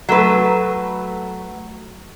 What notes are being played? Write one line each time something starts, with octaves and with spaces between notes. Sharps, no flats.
F#3 A3 B4